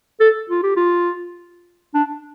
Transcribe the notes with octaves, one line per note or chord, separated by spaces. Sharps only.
A4
F4
G4
F4
D4